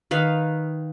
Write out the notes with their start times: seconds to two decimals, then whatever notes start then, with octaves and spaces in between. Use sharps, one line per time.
0.11 D#3 B4 F5